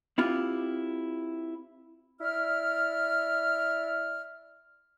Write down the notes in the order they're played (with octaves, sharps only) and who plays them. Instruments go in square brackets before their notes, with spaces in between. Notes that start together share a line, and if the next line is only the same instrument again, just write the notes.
[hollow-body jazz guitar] C4 E4 F4 G4
[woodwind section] E4 D5 F6